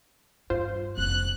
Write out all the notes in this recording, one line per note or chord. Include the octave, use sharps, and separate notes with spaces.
G2 F4 C5
F1 A#3 F#6